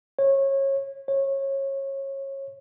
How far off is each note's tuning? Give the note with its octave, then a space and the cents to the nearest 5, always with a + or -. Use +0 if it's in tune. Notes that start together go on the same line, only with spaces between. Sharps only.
C#5 -25
C#5 -25